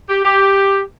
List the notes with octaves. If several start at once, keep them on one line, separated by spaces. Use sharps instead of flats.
G4
G4